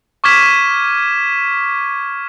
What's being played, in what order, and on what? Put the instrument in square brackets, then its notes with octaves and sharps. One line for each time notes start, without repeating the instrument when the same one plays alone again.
[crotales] C#6 D6 F6 G#6 B6 E7